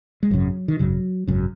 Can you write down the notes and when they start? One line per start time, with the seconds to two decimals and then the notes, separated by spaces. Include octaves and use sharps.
0.23 G#3
0.30 G#1 F#2 C#3 F#3
0.68 D#3
0.79 G#1 F#2 C#3 F#3
1.27 G#1 F#2 C#3